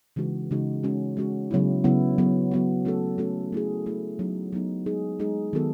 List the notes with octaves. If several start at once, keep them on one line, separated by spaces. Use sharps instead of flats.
C#3 E3 G#3 D#4 F#4
C#3 E3 G#3 D#4 F#4
G#3 C#4 F#4
G#3 C#4 F#4
C#3 F#3 B3 E4
C#3 F#3 B3 E4
F#3 B3 F#4
F#3 B3 F#4
A3 C#4 F#4 A4
A3 C#4 F#4 A4
A3 E4 G#4
A3 E4 G#4
F#3 B3 D#4
F#3 B3 D#4
G#3 D#4 G#4
G#3 D#4 G#4
D#3 F#3 B3 F#4 A4